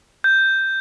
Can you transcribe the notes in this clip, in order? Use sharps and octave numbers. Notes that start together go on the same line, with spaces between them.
G6